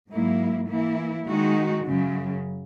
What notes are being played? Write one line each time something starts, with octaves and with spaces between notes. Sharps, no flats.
G#2 F#3 A#3 E4
E3 A#3 E4
D#3 G#3 D#4 F#4
F#2 C#3 F#3